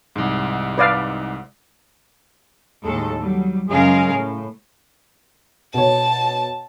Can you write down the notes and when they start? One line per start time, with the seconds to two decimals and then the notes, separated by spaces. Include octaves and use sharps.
0.16 C2 G#2
0.78 B4 D5 F5
2.84 D#2 A2 G#3 A4
3.18 F#3 G3
3.68 F#2 C#3 G#3 G#4 A#4 F5
4.10 A2 A3
5.74 B2 C#5 A5